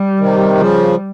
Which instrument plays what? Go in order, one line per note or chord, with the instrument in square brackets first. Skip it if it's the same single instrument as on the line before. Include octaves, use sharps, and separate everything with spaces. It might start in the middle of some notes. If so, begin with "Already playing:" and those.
Already playing: [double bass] G3
[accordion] C3 D#3
C#3 F3